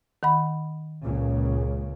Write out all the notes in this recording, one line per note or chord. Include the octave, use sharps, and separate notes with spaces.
D#3 F#5 B5
C#2 A#2 C#3